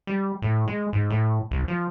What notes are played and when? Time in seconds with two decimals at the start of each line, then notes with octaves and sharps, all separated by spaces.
0.07 G3
0.42 A2
0.68 G#3
0.93 G#2
1.10 A2
1.51 C2
1.68 F3